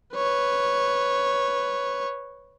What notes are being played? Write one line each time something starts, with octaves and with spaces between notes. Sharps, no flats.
B4 C#5